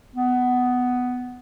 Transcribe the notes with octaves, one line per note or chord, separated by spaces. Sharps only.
B3